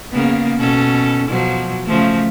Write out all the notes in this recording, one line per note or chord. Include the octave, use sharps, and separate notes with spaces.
C#3 A#3 B3
B2 C#4 A4
B2 F3 F#3
C#3 F3 A3